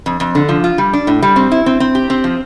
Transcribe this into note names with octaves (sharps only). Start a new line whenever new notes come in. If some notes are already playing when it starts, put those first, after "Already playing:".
F2
F2
D3
F3
F4
G3
D4
A2
G3
C4
E4
C4
C4
G4
C4
F3